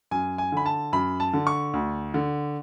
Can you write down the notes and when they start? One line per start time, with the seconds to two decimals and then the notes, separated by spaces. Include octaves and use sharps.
0.11 F#2 G#5
0.38 G#5
0.52 D3 B5
0.66 A5
0.93 F#2 B5
1.20 A5
1.33 D3
1.47 C#6
1.74 D2
2.14 D3